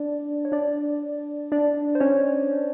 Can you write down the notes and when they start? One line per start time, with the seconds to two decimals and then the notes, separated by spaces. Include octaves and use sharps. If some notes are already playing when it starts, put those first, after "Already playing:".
Already playing: D4 D5
0.45 C#5
0.52 D4 D5
1.52 D4 D5
1.95 C5
2.00 C#4 C#5